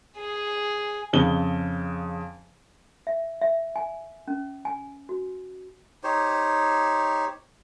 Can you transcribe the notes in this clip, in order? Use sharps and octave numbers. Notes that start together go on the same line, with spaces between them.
G#4
F2 C#3 G7
E5
E5
G#5
C#4
G#5
F#4
D#4 G4 C5 C#5